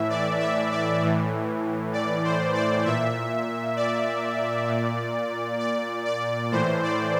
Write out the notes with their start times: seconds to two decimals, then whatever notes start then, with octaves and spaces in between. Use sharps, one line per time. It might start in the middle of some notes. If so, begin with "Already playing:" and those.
Already playing: A2 E3 E5
0.10 D5
0.40 E5
0.72 D5
1.02 A2 E3
1.93 D5
2.25 C5
2.55 D5
2.85 A#2 E5
3.76 D5
4.68 A#2
5.60 D5
6.05 D5
6.51 A2 E3 C5
6.83 D5